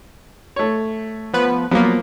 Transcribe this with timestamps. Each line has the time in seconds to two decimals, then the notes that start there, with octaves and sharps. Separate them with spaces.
0.56 A3 C#5
1.34 F3 B3 B4
1.71 F3 F#3 A#3 B3